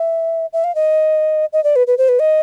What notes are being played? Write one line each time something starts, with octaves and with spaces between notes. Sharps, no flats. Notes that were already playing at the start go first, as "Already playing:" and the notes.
Already playing: E5
E5
F5
D#5
D#5
D5
B4
B4
C5
B4
D#5